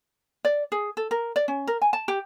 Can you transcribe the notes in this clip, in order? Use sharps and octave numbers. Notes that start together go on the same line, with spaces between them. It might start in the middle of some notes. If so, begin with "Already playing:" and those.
D5
G#4
A4
A#4
D5
C#4
A#4
G#5
A5
G4